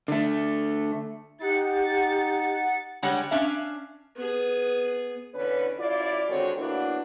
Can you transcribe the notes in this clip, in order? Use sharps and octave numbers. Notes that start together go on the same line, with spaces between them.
D3 A3
D#4 G4 F#5 A6 C#7
D3 G3 G#3 C#5 F#5
C#4 D4 E5 F5
B3 G#4
E2 D3 C#4 B4
F#2 E4 F4 D5
D3 D#3 G#3 C4 F#4 C#5
F#3 A#3 B3 D4 E4 F#4